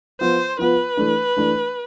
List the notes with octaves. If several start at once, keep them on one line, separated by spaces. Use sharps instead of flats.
F3 B3 F4 C5
F3 B3 F4 B4
E3 A3 D4
E3 A3 D4